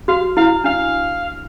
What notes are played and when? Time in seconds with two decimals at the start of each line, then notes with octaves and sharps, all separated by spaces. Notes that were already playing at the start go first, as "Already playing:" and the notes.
0.08 F#4 F5
0.37 E4 F5
0.64 D4 F5